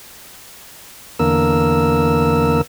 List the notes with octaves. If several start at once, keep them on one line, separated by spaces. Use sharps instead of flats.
E2 D3 A#3 A#4 E6